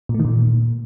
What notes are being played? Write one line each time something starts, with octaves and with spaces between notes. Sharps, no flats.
A#2
A3
D#3
A#2